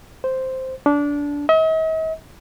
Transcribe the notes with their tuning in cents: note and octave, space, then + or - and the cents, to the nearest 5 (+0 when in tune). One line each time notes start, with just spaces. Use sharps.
C5 +0
D4 -20
D#5 +45